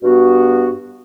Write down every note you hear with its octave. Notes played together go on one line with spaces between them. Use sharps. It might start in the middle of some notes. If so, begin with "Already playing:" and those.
G2 B3 F#4